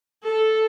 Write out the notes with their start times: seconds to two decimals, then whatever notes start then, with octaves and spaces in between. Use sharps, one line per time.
0.24 A4